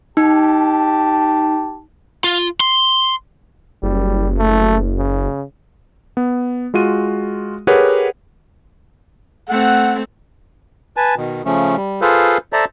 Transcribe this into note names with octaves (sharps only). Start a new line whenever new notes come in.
D#4 G4 A5
F4
C6
F#1 G3
A3
C#3
B3
G#3 F4 F#4 D#7
G4 G#4 A#4 B4 C#5 F#5
A3 C4 F#5
B4 G#5 A5
B2 D#3
C#3 F3 A3 C#4
G3
F4 G#4 A4 B4 C5 F5
A4 C5 D5 E5 A5 A#5